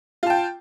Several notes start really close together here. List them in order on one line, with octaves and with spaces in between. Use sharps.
F4 A5 G5